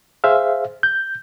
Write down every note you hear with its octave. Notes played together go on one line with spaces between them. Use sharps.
G#4 C5 E5 F5
G6